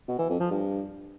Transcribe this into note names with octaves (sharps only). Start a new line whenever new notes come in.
B2
E3
F2
F3
G2